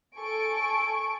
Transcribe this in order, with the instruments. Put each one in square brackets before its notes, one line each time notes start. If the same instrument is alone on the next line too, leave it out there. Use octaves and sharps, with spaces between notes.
[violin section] A4 G#5 C#6 D7